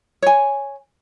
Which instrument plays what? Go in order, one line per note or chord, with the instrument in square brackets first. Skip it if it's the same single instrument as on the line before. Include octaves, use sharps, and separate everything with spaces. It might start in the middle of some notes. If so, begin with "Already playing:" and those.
[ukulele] C#5 G#5